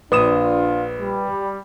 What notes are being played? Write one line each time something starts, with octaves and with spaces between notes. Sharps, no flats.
A#1 D4 F4 B4 D#6 E7
G3